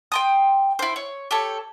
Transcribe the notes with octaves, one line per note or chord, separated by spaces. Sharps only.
G5 C6 D#6
E4 C5
C#5
G4 A4 C#5